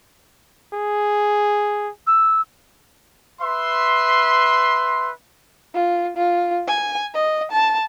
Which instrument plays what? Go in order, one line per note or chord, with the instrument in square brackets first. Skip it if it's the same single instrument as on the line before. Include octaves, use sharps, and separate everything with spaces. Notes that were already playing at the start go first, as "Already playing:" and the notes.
[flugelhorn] G#4
[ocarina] E6
[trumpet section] B4 E5 C6
[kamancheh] F4
F4
G#5
D#5
A5